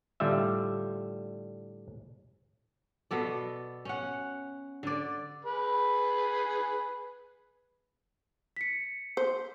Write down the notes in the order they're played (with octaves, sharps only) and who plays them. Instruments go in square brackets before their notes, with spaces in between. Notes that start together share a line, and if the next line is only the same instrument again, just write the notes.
[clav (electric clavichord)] A2 D3 G3 F4 E5
[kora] B2 B3 A4 D5
C#4 F#5
D3 D5
[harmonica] G#4 B4
[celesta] B6 C#7
[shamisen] C5